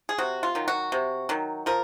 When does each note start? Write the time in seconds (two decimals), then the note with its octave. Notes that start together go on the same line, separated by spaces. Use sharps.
0.09 G#4
0.18 C3 F#4
0.43 F4
0.55 D#3 F#3
0.68 F#4
0.92 C3
1.29 D#3 F#3
1.66 F3 A#4